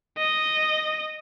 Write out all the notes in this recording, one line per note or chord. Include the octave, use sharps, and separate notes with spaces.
D#5